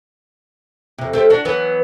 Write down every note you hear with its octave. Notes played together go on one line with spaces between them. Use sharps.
F2 C3
A3 G4 C5
D4 F#4
E3 F#3 B3